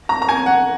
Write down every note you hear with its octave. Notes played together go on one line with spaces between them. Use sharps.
A#5
A#5
G#5
F#5